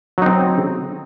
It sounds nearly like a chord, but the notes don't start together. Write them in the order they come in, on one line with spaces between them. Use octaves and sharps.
F#3 D#4 C4